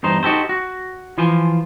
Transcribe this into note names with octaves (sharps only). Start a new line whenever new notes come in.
E2 G2 D#4 C5
D#4 F#4 G4 A4 C5
F#4
E3 F3 F4 C5 G#5